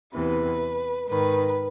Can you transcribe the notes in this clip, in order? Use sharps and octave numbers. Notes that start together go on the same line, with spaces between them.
E2 C3 E3 B4
G#2 D#3 B4